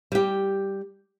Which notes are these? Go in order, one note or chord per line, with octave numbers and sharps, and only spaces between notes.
G3 G4